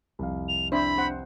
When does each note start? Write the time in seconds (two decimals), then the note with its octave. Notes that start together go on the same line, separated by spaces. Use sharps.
0.19 C2 F2 F5
0.48 F7
0.72 C4 D4 E4 C5 B5
0.98 C4 C5 F#5